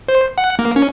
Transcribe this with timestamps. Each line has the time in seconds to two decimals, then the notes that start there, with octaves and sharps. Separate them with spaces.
0.08 C5
0.38 F#5
0.59 A#3
0.76 C#4